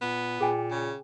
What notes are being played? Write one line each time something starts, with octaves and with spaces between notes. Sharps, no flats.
A#2 B3
A#2 G#4 G5 G#5
C#3